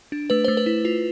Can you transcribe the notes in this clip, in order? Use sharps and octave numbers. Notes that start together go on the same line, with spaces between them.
D4
A3 B4
A3 C5
B4
E4
F4